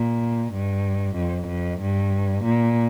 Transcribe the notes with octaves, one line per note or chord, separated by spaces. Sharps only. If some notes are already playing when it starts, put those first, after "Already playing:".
Already playing: A#2
G2
F2
F2
G2
A#2